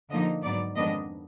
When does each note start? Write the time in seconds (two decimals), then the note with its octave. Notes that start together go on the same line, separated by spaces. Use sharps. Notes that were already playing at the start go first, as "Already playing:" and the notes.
0.10 D3 F3 A#3 D#4 D#5
0.43 G#2 F#3 B3 D#4 D5
0.75 F2 D#3 G#3 B3 D4 D#5